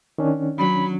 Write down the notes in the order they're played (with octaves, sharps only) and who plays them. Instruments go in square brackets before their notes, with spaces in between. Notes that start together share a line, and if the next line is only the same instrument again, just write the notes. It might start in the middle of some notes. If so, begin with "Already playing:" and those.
[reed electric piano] D#3 C#4 D4
[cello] F#3 [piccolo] B5